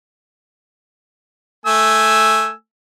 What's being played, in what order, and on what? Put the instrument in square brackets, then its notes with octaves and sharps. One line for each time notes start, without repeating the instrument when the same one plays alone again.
[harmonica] A3 G#5 E6